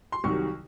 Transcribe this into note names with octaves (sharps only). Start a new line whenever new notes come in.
C6
C2 C3 D#3 F#3 C#6